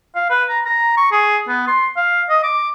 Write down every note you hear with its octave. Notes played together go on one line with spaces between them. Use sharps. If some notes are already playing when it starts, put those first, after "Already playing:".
F5
B4
A#5
A#5
C#6
G#4
B3
C6
F5
D#5
D6